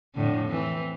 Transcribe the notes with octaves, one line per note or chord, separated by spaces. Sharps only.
F2 A2 D3
E3 C4